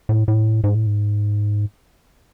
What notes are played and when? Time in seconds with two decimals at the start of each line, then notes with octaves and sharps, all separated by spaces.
0.09 A2
0.28 A2
0.64 G#2
0.74 A2
0.86 G#2